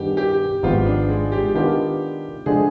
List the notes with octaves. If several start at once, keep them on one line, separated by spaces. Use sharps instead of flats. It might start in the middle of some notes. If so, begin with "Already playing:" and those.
Already playing: G2 D#3 B3 D4 G4 G#4
G4
G#1 G#2 F3 B3 D#4 F4
D4
G#3
G4
D#3 B3 D4 F4 G4
D3 F3 G#3 G#4